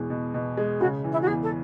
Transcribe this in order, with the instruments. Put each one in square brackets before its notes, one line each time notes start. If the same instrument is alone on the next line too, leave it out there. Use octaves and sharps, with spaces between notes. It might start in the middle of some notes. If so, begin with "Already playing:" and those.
Already playing: [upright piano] E2 B2 G#3
B2
B2
G#3
[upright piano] C#3 [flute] F#4
[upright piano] E3
[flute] E4
F#4
[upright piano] E2 [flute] G#4
[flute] A4